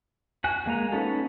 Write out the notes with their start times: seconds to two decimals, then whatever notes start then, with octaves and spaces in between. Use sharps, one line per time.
0.44 F#4 G#5 F#6
0.66 G#3 A#3 G#5 A#5
0.92 B3 C#4 D#4 F#4 A4